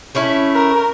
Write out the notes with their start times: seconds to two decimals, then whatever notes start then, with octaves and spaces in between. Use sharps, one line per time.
0.15 A3 C#4 E4
0.55 A#4